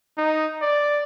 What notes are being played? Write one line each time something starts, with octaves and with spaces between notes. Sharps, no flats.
D#4
D5